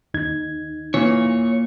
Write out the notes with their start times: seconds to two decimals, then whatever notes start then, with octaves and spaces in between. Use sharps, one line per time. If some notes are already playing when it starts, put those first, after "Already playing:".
0.14 D#2 D#4 G#6
0.94 A#2 E3 C#5